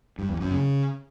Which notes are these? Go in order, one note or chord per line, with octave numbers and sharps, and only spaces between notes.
G2
E2
F#2
C#3